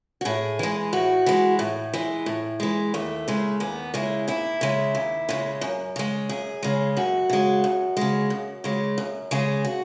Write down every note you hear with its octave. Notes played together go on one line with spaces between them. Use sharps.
F#4
A2 G#4
E3 G#3
A2 F#4
E3 G#3
A2
E3 G#3
A2
E3 G#3
D#2 A3
C#3 G#3
D#2 B3
C#3 G#3 E4
D#2 E4
C#3 G#3
D#2
C#3 G#3
F#2
C#3 G#3
F#2 G#4
C#3 G#3
F#2 F#4
C#3 G#3
F#2
C#3 G#3
F#2
C#3 G#3
F#2
C#3 G#3 G#4
F#4